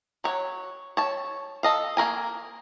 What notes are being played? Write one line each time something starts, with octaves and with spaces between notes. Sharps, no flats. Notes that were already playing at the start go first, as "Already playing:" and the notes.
F#3 C#5
C#5 A5
A4 D#5 F5
A#3 F#4 A#4 G#5